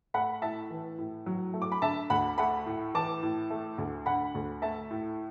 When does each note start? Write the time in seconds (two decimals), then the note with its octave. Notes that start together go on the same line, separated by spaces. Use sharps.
0.14 A3 F#5 B5
0.42 A2 E5 A5
0.70 E3
0.98 A2
1.26 F#3
1.54 A3
1.62 D6
1.72 B5
1.82 D3 E5 A5
2.10 D2 F#5 B5
2.38 A3 F#5 B5
2.66 A2
2.94 E3 A5 D6
3.23 A2
3.50 A3
3.78 D2
4.06 D3 F#5 B5
4.35 D2
4.62 A3 E5 A5
4.91 A2